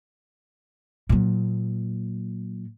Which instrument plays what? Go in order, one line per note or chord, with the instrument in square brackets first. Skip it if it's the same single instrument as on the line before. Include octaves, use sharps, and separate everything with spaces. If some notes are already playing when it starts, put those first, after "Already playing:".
[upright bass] A#2 F#3